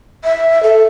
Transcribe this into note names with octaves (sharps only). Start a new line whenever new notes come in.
E5
A4